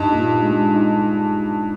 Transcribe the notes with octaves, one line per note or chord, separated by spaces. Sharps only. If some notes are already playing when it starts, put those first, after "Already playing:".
Already playing: G2 D#4
A#2
G#3
D#4